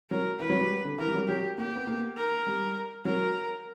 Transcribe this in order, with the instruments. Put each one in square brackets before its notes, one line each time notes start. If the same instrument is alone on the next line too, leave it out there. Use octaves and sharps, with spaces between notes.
[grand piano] F#3 [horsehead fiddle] A#4
[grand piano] E3 [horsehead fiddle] B4
[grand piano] F#3
G3
D3
[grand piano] E3 [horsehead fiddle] A#4
[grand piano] G3
F#3
[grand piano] F#3 [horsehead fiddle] G4
[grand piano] A#3 [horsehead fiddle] G4
[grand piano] B3
A#3
[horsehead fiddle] A#4
[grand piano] G3
[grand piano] F#3 [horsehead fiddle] A#4